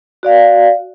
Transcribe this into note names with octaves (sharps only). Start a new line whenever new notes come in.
F#4 D5 F5